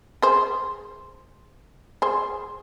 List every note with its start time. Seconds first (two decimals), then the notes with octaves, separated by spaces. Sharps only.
0.22 G#4 C5
2.02 G#4 C5